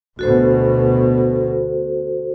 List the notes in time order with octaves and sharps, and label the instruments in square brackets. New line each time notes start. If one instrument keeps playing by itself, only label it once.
[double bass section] D2 B2 [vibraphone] F#4 A4 C5